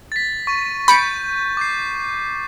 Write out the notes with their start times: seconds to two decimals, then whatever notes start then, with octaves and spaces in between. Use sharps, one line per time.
0.12 A6 B6
0.47 C#6 A6 D#7
0.88 B5 G6 A6 C#7 D7
1.57 D6 G6 C7